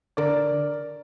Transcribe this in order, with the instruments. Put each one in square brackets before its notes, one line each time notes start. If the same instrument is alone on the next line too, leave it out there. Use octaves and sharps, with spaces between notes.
[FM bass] D3 [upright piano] A#4 D5